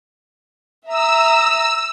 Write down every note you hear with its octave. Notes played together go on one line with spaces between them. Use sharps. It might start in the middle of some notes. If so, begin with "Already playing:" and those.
E5 A#5 D#6 E6